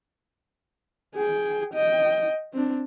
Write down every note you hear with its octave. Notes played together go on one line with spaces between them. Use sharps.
G#4 G5
D#5 G5
C4 D4